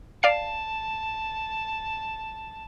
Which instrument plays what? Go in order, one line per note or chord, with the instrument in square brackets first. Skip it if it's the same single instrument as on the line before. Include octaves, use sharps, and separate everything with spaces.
[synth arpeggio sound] D5 F5 C7 [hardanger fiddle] A5